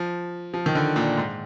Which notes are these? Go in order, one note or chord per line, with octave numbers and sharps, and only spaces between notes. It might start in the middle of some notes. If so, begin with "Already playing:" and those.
Already playing: F3
F3
D#3
D3
A#2
G#2